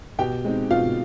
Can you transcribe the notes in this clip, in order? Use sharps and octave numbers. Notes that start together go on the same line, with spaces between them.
B2 G4 G5
G#3 C4 D#4
B2 F4 F5